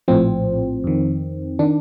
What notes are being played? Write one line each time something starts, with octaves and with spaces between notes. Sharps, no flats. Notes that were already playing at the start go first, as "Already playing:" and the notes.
A#1 A2 F3 C4
F2 D#3
D#3 D4